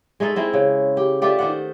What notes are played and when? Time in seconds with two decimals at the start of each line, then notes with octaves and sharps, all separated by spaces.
0.20 G#3 A3 D#4 A4
0.36 G#3 C4 E4
0.53 C#3
0.97 G4
1.22 A3 F4 G4 D5
1.39 D#3 C5 F#5